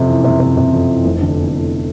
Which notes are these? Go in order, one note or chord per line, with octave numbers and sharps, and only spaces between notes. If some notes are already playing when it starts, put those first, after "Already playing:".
Already playing: F2 C3
E3
C3
C3
C3
F2
E3
F1
D3
E2
E2